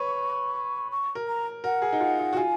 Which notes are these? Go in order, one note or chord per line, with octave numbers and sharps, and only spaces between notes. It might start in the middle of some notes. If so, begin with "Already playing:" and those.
Already playing: B4 C#5 C#6
C#6
A#4
A#5
A#4 F#5
G#4
D#4
F4
D#4
F#4
F4 G#5